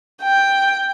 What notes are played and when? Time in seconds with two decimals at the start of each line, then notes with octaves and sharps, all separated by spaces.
0.23 G5